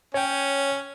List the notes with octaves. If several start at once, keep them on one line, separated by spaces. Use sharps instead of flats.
C#4 C#5 G5